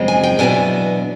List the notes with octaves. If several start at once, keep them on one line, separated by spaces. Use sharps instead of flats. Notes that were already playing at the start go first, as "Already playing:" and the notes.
Already playing: F#2 C#3 F3 G#3 C4
G#5
G5
E2 B2 F#3 B3 D4 G#5